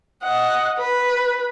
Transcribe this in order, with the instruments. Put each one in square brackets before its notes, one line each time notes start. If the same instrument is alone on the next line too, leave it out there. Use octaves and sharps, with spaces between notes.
[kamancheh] D#5 F#5
B4